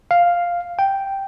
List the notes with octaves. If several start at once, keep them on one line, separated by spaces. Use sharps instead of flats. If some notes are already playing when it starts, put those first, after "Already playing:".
F5
G5